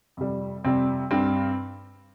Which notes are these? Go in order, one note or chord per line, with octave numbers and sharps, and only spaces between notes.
F2 C3 G3
F2 C3 G3 C4
G2 G3 C4